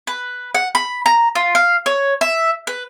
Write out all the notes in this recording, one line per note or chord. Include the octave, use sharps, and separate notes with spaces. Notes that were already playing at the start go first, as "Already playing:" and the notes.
B4
F#5
B5
A#5
F4
F5
C#5
E5
B4